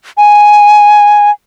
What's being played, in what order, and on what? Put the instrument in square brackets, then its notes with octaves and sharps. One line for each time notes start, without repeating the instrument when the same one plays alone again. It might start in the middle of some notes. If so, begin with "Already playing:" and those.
[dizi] G#5